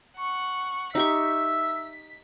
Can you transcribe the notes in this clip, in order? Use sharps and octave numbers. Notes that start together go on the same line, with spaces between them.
F#5 C#6
D#4 G4 E5 C#6 B6